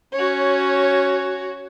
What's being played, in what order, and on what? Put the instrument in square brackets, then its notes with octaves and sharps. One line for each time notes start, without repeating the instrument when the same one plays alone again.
[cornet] C#4 [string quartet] F#4 C#5